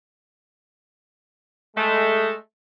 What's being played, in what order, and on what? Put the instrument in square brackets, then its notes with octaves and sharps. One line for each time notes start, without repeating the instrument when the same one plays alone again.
[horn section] G#3 A3